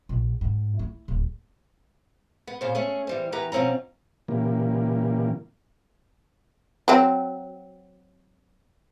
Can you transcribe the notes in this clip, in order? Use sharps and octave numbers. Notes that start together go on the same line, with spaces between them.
A#1
G#2
E4
D1
B3
A#2 C#3 C5
A3 C#4 G#4
E3 G3 C5
E2 G4 B4 A#5
B2 F3 C4 C#4 A#5
A#2 C#3 E3 G3 A#3
F#3 C4